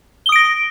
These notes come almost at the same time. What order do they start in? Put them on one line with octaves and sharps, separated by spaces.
G7 D#6 D7 A#6